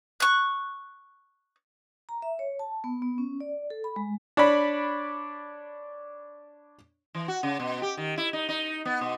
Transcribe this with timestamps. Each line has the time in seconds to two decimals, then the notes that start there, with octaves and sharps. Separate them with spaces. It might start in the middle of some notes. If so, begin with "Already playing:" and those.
0.20 C#6 F#6
2.09 A#5
2.22 E5
2.39 C#5
2.59 A5
2.84 B3
3.02 B3
3.18 C#4
3.41 D5
3.70 A4
3.84 B5
3.96 G#3
4.37 D4 C#5 D5 B5
7.15 E3
7.28 F#4
7.43 C#3
7.59 B2
7.82 G4
7.97 D#3
8.17 E4
8.33 D#4
8.49 D#4
8.85 B3
9.01 B2